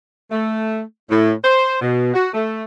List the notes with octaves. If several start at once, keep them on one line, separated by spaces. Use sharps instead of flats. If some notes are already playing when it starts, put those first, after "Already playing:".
A3
A2
C5
B2
F#4
A3